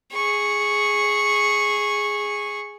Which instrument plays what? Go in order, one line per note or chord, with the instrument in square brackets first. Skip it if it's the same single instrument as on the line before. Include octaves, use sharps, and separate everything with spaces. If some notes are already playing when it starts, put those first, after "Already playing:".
[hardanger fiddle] G#4 C#6